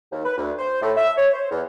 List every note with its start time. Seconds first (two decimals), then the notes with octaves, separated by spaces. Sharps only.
0.12 D#2
0.25 B4
0.37 D2
0.59 C5
0.82 A2
0.97 E5
1.17 C#5
1.34 C5
1.51 E2